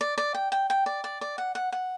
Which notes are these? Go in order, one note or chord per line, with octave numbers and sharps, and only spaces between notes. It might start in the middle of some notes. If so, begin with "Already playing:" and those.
D5
D5
G5
G5
G5
D5
D5
D5
F#5
F#5
F#5